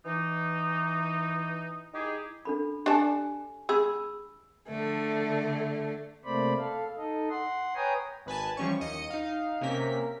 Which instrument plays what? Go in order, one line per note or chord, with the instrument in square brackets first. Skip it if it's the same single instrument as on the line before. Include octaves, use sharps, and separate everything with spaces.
[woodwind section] E3 D#4
D#4 E4 G4 G#4
[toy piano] D4 A4 B5
[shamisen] D4 A5 [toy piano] G4 G#5
[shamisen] G#4 [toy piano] B5 E6
[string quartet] D3 A3
[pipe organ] C3 A3 A#3 C5 D5 B5
A4 F5
D#4 A4 D#5
F#5 C6
B4 C#5 G5 G#5 A#5 D#6
[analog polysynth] G#1 B4 G#5 A5
E3 F3 G3 C#4 C#5 C#6
D#2 D#5 C#7 D#7
D#4 F5
C3 A#3 C#4 A#4 B6